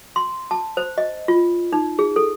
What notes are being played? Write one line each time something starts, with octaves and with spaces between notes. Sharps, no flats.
C6
A5
C5
D#5
F4
D#4
G#4
A4